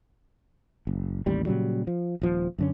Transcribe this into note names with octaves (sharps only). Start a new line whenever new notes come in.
F#1
A1 D#2 G3
A#2 C#3 F#3 G3
F3
D#1 F3
F#2 D3 C#4